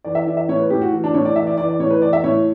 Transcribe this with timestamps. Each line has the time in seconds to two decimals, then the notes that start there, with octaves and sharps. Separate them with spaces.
0.05 E3 D5
0.15 E5
0.27 E3 D5
0.37 E5
0.49 A2 C#5
0.59 B4
0.70 A2 G4
0.81 F#4
0.92 E3
1.04 D4
1.14 A2 C#5
1.25 D5
1.36 E3 E5
1.47 D5
1.57 E3 D5
1.69 D5
1.79 A2 C#5
1.90 B4
2.02 E3 D5
2.13 E5
2.24 A2 C#5